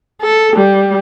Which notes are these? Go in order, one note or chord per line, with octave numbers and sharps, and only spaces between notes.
A4
G3